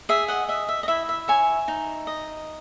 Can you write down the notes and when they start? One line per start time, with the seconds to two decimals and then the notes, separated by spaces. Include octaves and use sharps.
0.09 G#4 E5
0.28 D#5 F#5
0.48 D#5 E5
0.69 E5
0.83 D#5
0.88 E4 E5
1.09 E5
1.28 C#5 E5 G#5
1.68 D#4
2.07 D#5